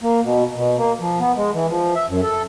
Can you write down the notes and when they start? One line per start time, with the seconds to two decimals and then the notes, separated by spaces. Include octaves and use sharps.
0.02 A#3
0.23 B2
0.56 B2
0.77 A#3
1.00 F3
1.20 B3
1.36 G#3
1.53 E3
1.69 F3
1.95 E5
2.08 F#2
2.23 A4